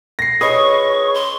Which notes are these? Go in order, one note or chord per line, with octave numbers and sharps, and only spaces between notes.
A#6 C7
G#4 B4 C#5 D#5 B5 C#6 D#6
C6